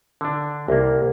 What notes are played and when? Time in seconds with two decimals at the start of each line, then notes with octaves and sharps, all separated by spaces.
0.21 D3 D4
0.68 C2 A#3